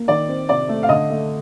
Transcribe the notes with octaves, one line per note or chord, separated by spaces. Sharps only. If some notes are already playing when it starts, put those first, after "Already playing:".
Already playing: A#3
D#3 D5
C4
C3 D5
A3
F5
D3 D#5
A3